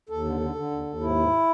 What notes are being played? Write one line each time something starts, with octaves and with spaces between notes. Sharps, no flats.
D#2 A4
D3
D3
D3
D#2
D#2
G#2 E4
G#2